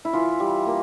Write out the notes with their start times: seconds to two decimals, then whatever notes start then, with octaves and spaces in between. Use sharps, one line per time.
0.05 E4
0.13 E3 F4
0.40 G3
0.66 A#3